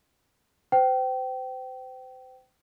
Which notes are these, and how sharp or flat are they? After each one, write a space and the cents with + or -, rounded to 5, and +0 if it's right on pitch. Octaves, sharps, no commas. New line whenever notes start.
C5 -35 G5 -25